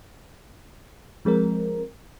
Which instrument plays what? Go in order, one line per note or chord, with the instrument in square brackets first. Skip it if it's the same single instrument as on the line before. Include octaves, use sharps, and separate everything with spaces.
[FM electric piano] F3 G#3 C4 A#4